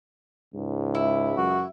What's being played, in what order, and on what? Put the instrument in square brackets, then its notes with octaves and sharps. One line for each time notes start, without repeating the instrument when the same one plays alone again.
[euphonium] C#2 [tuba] G#2
[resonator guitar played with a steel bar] E4
[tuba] F#2 [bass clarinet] F#4